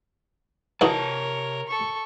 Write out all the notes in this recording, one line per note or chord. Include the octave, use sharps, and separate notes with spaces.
C3 E3 D#4 F#4 A#4 C#5 A5
A4 C#6